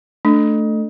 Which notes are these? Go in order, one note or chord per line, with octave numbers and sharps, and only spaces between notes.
A3 D4